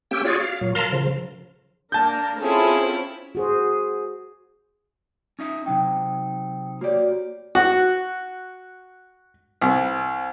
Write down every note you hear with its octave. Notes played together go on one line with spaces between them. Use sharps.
A#3 C#4 G4 G5 E6
F4 F#4 G#4 C#5 D5
F5
A#2 F#3
A#4 F5 A5 A#5 C6
C#3 F3
A#3 D4 A#4 A5 G6
C4 C#4 E4 F4 G#4 A4
F#4 G#4 C5
C#4 D#4 E5
C3 F#3 D#4 G5
A#3 F#4 G4 C#5 D5
F#4
C2